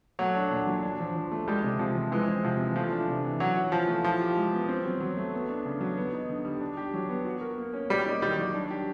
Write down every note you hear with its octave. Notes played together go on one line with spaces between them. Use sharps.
F#3 A3
D4
A#2
F#3
D4
F3
F3
A3
G3 G#3
C3
C3 F3
F3
E3 G#3
C4
C3 F3
E3
F3 A3
D4
C3
E3
F#3 C#4
F#4
E3 F3
A3
F3 E4
G4
G#3
B3
C4
F#3
F#3
A3
B3
D4
C#3
F#3
B3
D#4
D3
G3
D4
G4
F#3
B3
F#4
A#4
A#3
C#4
G3 A#3
D#4
D#3 G3
F#3
D4
G4